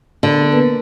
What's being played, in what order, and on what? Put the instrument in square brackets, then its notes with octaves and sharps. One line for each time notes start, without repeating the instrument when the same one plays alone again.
[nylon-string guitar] D3 [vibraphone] B3 A#4
[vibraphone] A#3 A#4 B4